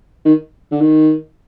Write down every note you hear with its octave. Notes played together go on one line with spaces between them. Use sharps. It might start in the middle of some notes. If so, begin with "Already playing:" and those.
D#3
D3
D#3